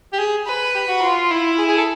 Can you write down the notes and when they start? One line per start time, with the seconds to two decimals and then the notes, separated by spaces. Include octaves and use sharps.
0.13 G4
0.19 G#4
0.47 B4
0.75 G4
0.88 F#4
1.02 F4
1.31 E4
1.58 G#4
1.68 G#4
1.78 A4